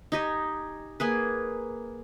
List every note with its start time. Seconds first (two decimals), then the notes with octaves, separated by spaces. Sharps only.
0.12 D#4 G4 G#5
1.00 A#3 G#4 B4